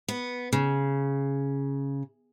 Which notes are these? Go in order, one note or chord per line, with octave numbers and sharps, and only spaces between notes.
B3
C#3